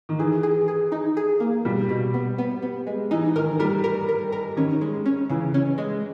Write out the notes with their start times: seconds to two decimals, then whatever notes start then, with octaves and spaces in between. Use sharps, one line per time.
0.09 D#3
0.19 E3 G#4
0.43 G#4
0.68 G#4
0.92 D#4
1.17 G#4
1.40 A#3
1.65 B2 G3
1.89 B2
2.14 B3
2.38 B3
2.62 B3
2.87 G#3
3.11 E3 D#4
3.36 D#3 A#4
3.59 G3 A#4
3.84 A#4
4.09 A#4
4.32 A#4
4.57 D#3 C#4
4.81 G#3
5.06 C#4
5.30 C#3 E3
5.54 C#4
5.78 G#3